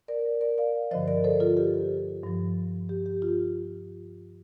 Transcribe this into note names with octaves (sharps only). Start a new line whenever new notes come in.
A#4 D5
A#4 D5
D5 F5
G2 D3 F3 C5 D#5
A#4 D5
A4 C5
F4 A4
G4
G2 F3
G4
G4
F4